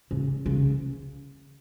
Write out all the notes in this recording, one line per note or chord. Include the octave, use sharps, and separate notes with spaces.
C#3
C#3